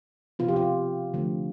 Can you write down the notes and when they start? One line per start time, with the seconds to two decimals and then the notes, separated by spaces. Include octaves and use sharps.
0.39 C3 F3 B3 F4
0.48 G4
0.56 F4
1.14 D3 F3 A3